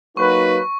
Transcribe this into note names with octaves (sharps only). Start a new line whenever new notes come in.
F#3 A#3 D#4 F#4 B4 C#6